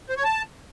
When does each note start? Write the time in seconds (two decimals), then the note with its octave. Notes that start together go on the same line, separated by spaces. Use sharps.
0.09 C5
0.16 C#5
0.24 A5